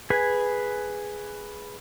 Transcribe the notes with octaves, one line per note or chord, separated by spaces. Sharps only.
G#4 B4 G#5